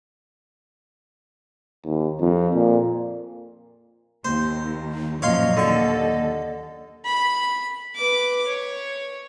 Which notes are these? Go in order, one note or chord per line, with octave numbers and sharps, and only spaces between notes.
D#2
F2
A#2
D#2 C5
F#2 A#2 F3 C#5 D#5 F5 C6
D#2 D3 A4 C#6
B5
B4 D6
C#5